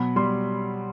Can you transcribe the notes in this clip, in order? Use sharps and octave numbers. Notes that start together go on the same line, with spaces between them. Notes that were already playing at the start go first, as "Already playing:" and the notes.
Already playing: B2 F#3 B5
G3 C6